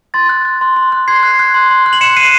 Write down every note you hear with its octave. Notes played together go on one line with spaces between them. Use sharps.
C6 A6
F#6
F#6
C6
C6
F#6
C6 G#6 C7
F#6
F#6
C6
C6
F#6
F#7
C6 C#7 E7
F#6 C7 D#7